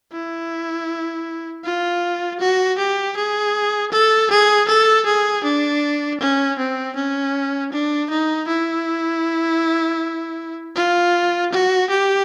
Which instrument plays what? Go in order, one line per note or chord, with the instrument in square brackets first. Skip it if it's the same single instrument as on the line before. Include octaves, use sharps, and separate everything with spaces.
[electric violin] E4
F4
F#4
G4
G#4
A4
G#4
A4
G#4
D4
C#4
C4
C#4
D4
D#4
E4
F4
F#4
G4